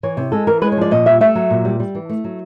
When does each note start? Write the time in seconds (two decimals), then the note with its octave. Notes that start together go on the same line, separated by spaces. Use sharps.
0.03 E3 C#5
0.17 C3
0.32 G#3 A4
0.47 E3 A#4
0.62 G#3 B4
0.72 C#5
0.77 F3 D5
0.91 A#2 D#5
1.06 G3 E5
1.21 A3 E5
1.35 F#3
1.50 A#2
1.65 G3
1.80 G3
1.95 E3
2.09 A3
2.24 F#3